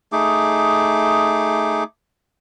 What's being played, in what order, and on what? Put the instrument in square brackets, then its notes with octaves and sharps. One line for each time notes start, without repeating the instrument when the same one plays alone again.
[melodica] A3 D#4 G#4 D6